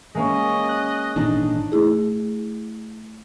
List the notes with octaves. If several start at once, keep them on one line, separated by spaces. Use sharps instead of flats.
G#3 A#3 C#4 D#5
F#6
G#1 A#2 E3 D4 D#4
A3 E4 G#4